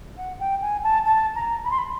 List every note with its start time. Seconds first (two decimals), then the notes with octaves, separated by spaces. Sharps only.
0.17 F#5
0.39 G5
0.62 G#5
0.83 A5
1.05 A5
1.35 A#5
1.64 B5
1.70 C6
1.78 B5